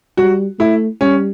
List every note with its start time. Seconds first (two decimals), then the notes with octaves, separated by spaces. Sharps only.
0.17 G3 F#4
0.59 A3 E4
1.01 G3 C#4